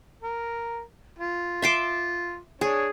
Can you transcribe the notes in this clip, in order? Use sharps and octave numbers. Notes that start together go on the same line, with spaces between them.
A#4
F4
E5 C6 D6
D4 G#4 C#5